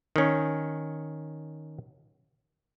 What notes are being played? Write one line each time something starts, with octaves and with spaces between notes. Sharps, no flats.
D#3 C#4